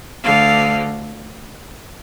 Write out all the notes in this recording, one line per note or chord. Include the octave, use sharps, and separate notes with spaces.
D2 D3 F5